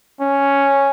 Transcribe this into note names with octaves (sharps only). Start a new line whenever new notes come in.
C#4